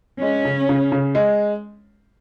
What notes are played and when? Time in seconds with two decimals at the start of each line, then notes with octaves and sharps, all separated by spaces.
0.22 G#3 C#4
0.45 C#3
0.69 C#3
0.92 C#3
1.15 G#3